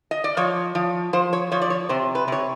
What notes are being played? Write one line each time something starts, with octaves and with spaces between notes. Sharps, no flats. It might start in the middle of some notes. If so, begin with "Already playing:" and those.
D#5
D5
F3 C#5
F3
F3 C5
C#5
F3 C#5
D5
C#5
C3 C5
B4
C3 C#5